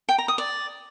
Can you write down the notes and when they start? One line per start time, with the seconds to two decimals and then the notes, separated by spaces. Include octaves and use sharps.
0.09 G5
0.18 A#5
0.28 D#6
0.38 D5